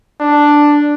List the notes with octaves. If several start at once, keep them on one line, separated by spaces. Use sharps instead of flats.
D4